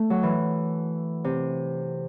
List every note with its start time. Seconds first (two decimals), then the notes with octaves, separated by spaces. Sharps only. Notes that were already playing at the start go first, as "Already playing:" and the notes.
Already playing: A3
0.10 F#3
0.23 E3
1.24 C3